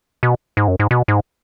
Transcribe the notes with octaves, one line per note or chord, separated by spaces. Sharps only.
B2
G#2
F#2
G#2
B2
G#2